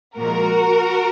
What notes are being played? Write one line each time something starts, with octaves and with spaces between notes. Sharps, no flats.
A#2 F3 G#3 F#4 A#4